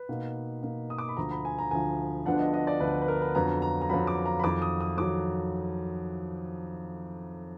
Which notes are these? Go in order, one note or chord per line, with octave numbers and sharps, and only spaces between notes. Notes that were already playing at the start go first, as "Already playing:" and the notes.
Already playing: B4
B2 A#3 D#4
B2 A#3 D#4
D#6
D6
B5
D2 D3 F3 A#5
B5
G#5
A#5
D2 D3 F3 G#5
D2 D3 F3 B3 D4 F#5
D#5
D#5
D5
D2 D3 F3 B3 D4 B4
B4
A#4
B4
F2 D3 F#3 B3 A#5
A#5
A#5
F2 D3 F#3 B3 B5
D6
A#5
B5
F2 D#3 F#3 D6
D#6
D#6
F2 D#3 F#3 D6